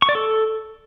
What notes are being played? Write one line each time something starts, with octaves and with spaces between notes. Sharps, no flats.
C#6
D5
A4